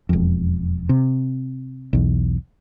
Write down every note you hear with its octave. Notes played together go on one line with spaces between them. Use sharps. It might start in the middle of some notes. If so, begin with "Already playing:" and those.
E1 F2
C3
B1 E2